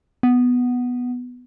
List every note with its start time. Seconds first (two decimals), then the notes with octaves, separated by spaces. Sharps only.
0.23 B3